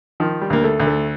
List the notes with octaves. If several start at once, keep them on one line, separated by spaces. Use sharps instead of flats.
D#3 F3
G3
D2 A#3
A3
D2
A3